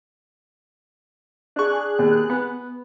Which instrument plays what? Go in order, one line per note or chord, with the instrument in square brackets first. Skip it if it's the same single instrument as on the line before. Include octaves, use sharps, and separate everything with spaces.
[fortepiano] D4 C#6 [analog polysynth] G#4 F#6
[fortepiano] D#2
B3